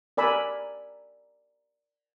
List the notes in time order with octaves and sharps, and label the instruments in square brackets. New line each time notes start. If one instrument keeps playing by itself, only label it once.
[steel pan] A#4 D5 G#5 B5 E6